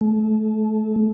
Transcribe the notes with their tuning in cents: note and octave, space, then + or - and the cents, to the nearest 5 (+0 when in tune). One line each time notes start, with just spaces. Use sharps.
A3 -30